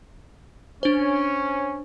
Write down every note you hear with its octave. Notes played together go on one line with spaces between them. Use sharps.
C#4 D4 C5